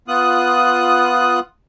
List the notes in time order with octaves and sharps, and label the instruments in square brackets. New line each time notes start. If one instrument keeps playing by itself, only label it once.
[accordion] B3 F4 D#6 F#6